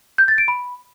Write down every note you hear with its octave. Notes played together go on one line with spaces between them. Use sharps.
G6
A6
D7
B5